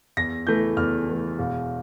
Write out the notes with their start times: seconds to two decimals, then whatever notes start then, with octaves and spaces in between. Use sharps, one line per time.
0.17 E2 A#6
0.47 E3 A3 G6
0.77 E2 F6
1.08 E3 A3
1.39 E1